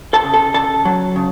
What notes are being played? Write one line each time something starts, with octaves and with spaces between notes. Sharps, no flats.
A4 A5
C#3
A4 A5
C#3 A4 A5
F#3
C#3